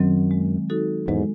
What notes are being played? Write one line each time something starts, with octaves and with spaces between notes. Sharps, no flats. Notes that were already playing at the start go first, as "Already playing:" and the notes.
Already playing: F#2 D#3 F#3 C4
G#3
D#4 F#4 A4
E2 G#2 G#3